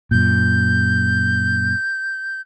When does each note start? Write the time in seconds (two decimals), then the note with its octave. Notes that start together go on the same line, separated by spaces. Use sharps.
0.11 F#2 A#2 G6